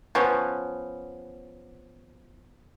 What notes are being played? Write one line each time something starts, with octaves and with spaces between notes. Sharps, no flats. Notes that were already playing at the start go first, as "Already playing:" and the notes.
F3 B3 C#4